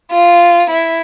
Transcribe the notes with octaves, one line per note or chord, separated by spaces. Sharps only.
F4
E4